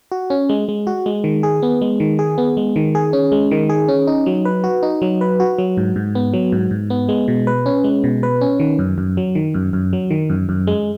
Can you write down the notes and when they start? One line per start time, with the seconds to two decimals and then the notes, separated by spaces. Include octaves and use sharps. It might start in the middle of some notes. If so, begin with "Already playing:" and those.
0.12 F#4
0.30 C#4
0.49 G#3
0.69 G#3
0.87 F#4
1.06 G#3
1.24 D#3
1.43 G#4
1.63 B3
1.81 G#3
2.00 D#3
2.19 G#4
2.38 B3
2.57 G#3
2.76 D#3
2.95 G#4
3.13 C#4
3.32 G#3
3.51 D#3
3.69 G#4
3.88 C#4
4.07 D#4
4.26 F#3
4.45 B4
4.64 F#4
4.83 D#4
5.02 F#3
5.21 B4
5.40 F#4
5.58 F#3
5.77 G#2
5.96 G#2
6.15 B3
6.34 F#3
6.52 G#2
6.71 G#2
6.90 B3
7.09 G#3
7.28 B2
7.47 B4
7.66 C#4
7.84 G#3
8.04 B2
8.23 B4
8.41 C#4
8.60 D#3
8.79 F#2
8.98 F#2
9.17 F#3
9.35 D#3
9.54 F#2
9.73 F#2
9.93 F#3
10.10 D#3
10.30 F#2
10.49 F#2
10.67 G#3